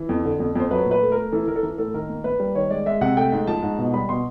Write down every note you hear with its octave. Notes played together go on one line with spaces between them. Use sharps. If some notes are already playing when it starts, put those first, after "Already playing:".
Already playing: E3
F2
D3
F2
F2 C5
F#3 B4
A#2
B4
A3
A#4
A3
E3 A4
E3 A#4
A4
E3 A#4
A2 A4
D#3 A#4
A#3
A#3 B4
G3
D#3 C#5
G#3 D5
G#3 E5
C3 F#5
A3 G5
G#2
F3 A5
G#2
B2
G3 B5
B2 C6